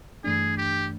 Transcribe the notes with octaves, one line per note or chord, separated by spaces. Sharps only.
G2 E3 A3 D4 G#4
G4